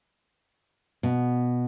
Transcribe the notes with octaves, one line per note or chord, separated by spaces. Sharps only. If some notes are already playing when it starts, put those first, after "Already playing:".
B2